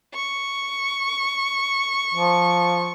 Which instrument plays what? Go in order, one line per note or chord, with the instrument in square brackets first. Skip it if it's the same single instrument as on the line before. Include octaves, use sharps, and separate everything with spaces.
[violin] C#6
[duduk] F3